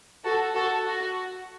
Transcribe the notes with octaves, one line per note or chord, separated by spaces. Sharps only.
F#4 A4
F#4 A4
F#4